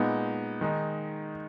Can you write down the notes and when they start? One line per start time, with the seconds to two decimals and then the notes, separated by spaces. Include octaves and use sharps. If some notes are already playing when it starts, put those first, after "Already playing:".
Already playing: A#2 G#3 B3 D#4
0.61 D#3 G#3 D#4